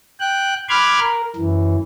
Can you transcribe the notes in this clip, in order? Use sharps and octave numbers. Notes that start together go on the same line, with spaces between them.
G5 F#6
B5 C6 D6 F6 F#6 G#6
A#4
F#2 E3